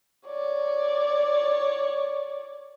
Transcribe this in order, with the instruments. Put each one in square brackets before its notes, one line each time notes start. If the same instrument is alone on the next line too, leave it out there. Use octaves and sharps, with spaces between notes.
[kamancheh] C#5 D5